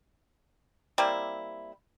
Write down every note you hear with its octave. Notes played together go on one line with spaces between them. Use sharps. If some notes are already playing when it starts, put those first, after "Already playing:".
G3 A#3 C4 E4